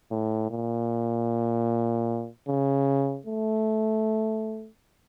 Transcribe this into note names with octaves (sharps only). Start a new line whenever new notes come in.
A2
A#2
C#3
A3